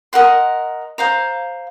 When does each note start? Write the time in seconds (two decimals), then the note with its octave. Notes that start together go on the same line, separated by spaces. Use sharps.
0.13 A#4 D#5 F#5 C6
0.98 C5 F5 A#5